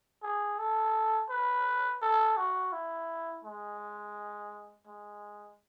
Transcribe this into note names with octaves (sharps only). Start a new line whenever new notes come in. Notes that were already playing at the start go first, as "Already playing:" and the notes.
G#4
A4
B4
A4
F#4
E4
G#3
G#3